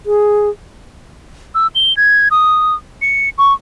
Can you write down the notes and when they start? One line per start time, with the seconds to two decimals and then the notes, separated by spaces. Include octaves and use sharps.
0.06 G#4
1.55 E6
1.75 G7
1.97 G#6
2.31 D#6
3.02 C#7
3.38 C#6